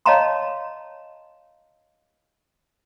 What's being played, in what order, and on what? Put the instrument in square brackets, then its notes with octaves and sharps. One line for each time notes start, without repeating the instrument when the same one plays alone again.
[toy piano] C#5 D#5 F5 A5 A#5 C6